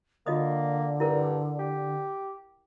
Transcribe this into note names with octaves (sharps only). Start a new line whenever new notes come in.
D3 A#3 F4 D#5 D#6
G2 E4 A#4
G4